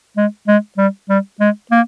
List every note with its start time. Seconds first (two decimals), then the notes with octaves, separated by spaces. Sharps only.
0.17 G#3
0.47 G#3
0.78 G3
1.09 G3
1.40 G#3
1.71 A#3